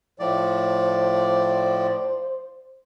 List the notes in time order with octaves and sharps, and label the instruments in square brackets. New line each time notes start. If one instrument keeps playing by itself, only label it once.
[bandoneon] A2 F3 D5 [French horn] C5